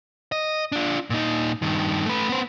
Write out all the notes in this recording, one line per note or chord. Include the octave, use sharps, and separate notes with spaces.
D#5
D4 F4
A#2 D#4
G2 D#3
A3 B4
B3 C5